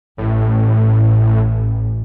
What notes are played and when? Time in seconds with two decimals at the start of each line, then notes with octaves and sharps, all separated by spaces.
0.18 A1 A2